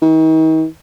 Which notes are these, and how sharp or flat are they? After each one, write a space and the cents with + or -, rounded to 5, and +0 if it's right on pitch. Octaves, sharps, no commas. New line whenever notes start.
D#3 +40